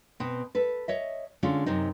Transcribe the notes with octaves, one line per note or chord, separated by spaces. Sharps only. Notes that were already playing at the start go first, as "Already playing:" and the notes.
B2 C4
A4 B4
C#5 D#5 E5
D3 G#3 C#4 F4
F#2 C3 C4 D#4